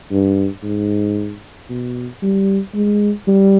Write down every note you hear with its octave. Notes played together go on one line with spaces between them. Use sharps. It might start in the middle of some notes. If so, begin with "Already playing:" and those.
G2
G#2
B2
G3
G#3
G3